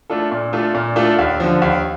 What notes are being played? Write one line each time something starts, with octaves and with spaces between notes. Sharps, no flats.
A3 D4 F4 A4
A#2
A3 D4 F4 A4
A#2
A3 D4 F4 A4
D#2
D3 F3
D#2